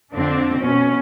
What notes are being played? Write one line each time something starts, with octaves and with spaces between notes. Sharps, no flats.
F2 D3 C4 D4
B2 C#4